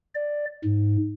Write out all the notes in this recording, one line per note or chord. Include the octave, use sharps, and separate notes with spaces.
D5
G#2